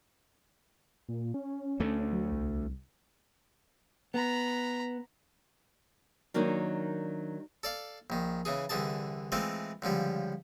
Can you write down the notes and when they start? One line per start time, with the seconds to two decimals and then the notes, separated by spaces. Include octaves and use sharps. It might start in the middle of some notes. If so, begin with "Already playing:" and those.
1.09 A#2
1.34 C#4
1.80 D2 A3
2.13 F#3
2.32 C2
4.14 B3 A#5 B5
6.34 D#3 F#3 A#3 D4 D#4
7.63 A4 D5 F5
8.10 A#1 D#3
8.45 C#3 E3 G#4
8.69 C2 D3 E3 G#4 A5
9.32 E3 G#3 A3 C4 F4
9.82 C#2 D3 F3 G3